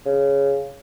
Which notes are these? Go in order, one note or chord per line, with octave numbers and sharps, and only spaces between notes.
C#3